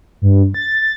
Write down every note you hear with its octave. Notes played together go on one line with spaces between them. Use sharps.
G2
A6
A6